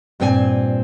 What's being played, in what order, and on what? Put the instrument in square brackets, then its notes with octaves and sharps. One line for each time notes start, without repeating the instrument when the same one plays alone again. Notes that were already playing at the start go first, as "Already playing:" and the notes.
[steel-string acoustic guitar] G2 A#2 C4 A#4 G#5